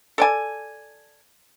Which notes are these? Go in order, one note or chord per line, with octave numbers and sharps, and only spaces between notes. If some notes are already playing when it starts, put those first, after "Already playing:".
A4 D5 G#5